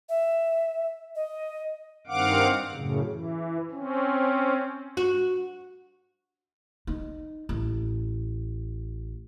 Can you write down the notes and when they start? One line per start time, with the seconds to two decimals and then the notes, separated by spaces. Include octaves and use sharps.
0.09 E5
1.15 D#5
2.07 G2 D#3 C4 F5 F#5 D6
2.72 F#2 A2 C#3
3.06 E3
3.71 C4 C#4
4.97 F#4
6.87 D#4
7.49 A1